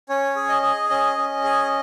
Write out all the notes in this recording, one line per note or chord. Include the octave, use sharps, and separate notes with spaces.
C#4 C#5
G#4
D#5
G#4
C#4 D#5
C#4
G#4